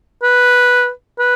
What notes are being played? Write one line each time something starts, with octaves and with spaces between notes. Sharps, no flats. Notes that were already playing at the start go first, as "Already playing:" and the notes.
B4
B4